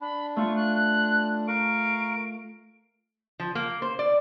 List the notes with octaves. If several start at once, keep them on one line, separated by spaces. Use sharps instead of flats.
D4 B5
A3 F4 C#6
F#6
A#4 F5 C#6 D7
F3
A#3
C5
D5